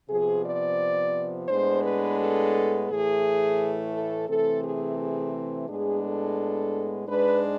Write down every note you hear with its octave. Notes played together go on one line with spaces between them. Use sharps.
C3 F3 B3 G#4
D5
A2 G#3 B3 D4 C5
B4
A4
A2 E3 A3 G#4
A4
C3 E3 A3 C4 A4
G#4
G#4
A2 G#3 B3 D4 G#4
A4
G#2 G#3 D4 B4